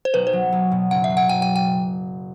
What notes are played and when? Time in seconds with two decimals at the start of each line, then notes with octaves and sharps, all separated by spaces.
0.05 C5
0.14 B1 B4
0.27 C5
0.33 F#3
0.52 B1
0.72 B2
0.91 F#1 F#5
1.04 E5
1.10 F#3
1.17 F#5
1.29 F#1 G5
1.42 G5
1.56 G5